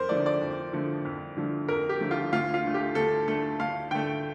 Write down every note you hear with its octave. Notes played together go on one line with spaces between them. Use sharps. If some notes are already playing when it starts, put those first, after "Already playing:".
Already playing: F2 A#4 C5
D3 F3 A3 D5
D5
F2
D3 F3 A3
F2
D3 F3 A3
F2 A#4
G4
D3 F3 A3
F4
D2 F4
F4
D3 A3
G4
D2 A4
D3 A3 A4
D2 F5
D3 A3 G5